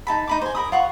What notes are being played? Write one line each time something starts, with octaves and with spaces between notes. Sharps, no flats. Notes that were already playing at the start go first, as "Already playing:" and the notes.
D#4 A5 B5
D#4 B5 D6
C5 G#5
A#4 B5 D#6
F4 F5 F#5 C#6